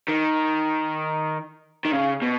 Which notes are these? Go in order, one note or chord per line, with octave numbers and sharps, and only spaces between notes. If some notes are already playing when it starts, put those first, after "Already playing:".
D#3
D#3
C#3
B2